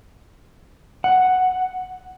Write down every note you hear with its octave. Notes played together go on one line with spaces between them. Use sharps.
F#5